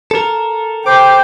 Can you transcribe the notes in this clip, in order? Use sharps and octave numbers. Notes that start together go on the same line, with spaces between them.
A4 A#4
C5 G5 D6